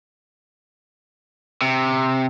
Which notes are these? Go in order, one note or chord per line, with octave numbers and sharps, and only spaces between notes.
C3